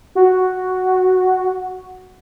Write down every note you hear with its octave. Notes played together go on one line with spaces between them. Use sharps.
F#4